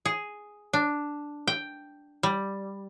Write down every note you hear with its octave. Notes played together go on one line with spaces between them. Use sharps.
G#4
D4
G5
G3